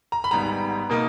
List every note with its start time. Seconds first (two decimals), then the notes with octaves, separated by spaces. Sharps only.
0.12 A#5
0.24 B5
0.31 G#1 G#2 G3 B3 A#5
0.90 B2 A#3 D#4